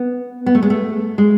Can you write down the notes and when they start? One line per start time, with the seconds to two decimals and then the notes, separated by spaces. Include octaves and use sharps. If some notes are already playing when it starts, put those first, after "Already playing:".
Already playing: B3
0.46 B3
0.55 A3
0.63 G#3
0.70 A3
1.18 G#3